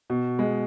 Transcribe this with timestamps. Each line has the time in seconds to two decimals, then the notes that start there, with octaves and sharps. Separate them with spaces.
0.10 B2
0.39 G#3